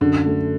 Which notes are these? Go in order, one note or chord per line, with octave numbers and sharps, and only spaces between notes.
F#2 D3
A3